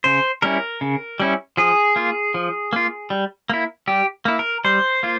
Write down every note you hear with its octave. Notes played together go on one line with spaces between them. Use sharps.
C#3 C5
G3 C#4 E4 A#4
C#3
G3 C#4 E4
F3 G#4
A#3 F4
F3
A#3 F4
G3
A#3 E4
G3 G4
A#3 E4
A#4
G3 C5
A#3 F4